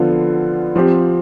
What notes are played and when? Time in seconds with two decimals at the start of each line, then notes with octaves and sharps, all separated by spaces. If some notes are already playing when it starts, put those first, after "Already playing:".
Already playing: D3 F3 B3 F4 A4
0.76 F3 C4 G4